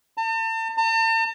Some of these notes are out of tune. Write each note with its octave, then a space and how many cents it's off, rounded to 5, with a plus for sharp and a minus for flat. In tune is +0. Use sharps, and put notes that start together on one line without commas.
A5 +40
A5 +45